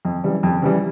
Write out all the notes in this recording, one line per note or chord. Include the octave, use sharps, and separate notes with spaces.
F2
C#3 E3 G3
F2
C#3 E3 G3